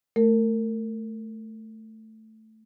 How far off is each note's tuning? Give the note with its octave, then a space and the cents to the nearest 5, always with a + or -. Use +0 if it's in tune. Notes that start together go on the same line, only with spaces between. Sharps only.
A3 +0 A#4 -25